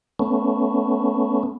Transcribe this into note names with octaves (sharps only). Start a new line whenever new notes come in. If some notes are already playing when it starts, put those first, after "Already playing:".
A3 B3 C#4